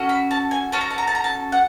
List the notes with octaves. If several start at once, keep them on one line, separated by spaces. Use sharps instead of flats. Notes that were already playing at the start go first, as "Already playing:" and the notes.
Already playing: C#4 F#4 A4
B5
A5
G#5
C#4 F#4 A4 A5
A#5
A5
A#5
A5
A#5
A5
F#5